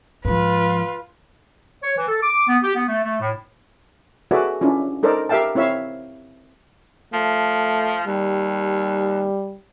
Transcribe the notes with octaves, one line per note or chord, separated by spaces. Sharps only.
G#2 F3 F4 B4
C#5
E3
A4
D6
B3
G4
B3
A3
A3
A2
F#4 G#4 A4 B4 D5 E5
C#4 D4 E4 F4
D#4 A4 A#4 C5 D5
G4 A#4 E5 F5 G5 A5
C4 E4 C#5 E5 F5
F3 A3
D#2 G3